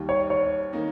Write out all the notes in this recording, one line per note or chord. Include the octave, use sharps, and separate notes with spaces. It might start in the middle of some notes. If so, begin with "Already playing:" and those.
Already playing: D#2 D#3 G3
C#5
C#5
D#3 A#3 D#4